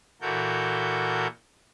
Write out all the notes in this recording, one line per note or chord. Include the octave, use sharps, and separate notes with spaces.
A#2 E3 F#4 A4 A#4 G6